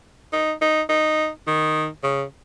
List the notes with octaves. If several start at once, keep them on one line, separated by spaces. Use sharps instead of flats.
D#4
D#4
D#4
D#3
C#3